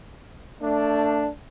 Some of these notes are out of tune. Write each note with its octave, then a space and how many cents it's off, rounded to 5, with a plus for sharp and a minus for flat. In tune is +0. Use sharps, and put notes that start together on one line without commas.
A3 +25 D4 +0